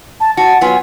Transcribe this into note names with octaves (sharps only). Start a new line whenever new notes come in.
A5
F#4 A5
F#3 B3 F4 G#5